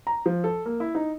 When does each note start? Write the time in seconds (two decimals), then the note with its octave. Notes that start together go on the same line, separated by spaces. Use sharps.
0.07 A#5
0.26 F3
0.44 A4
0.66 A#3
0.80 E4
0.95 D#4